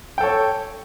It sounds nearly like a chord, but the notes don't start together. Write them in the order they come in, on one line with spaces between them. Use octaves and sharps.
G5 A4 C#5